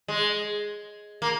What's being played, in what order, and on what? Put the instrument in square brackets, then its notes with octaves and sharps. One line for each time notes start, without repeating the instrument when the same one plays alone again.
[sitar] G#3
A#3